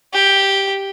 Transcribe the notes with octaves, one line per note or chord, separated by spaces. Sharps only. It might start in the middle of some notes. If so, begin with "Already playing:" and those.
G4